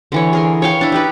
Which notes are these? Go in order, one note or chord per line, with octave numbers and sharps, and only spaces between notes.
D3 E3 C#5
G#4 A#4 C6
C#5 F5 G5
D4 E4
D#4 G4 B4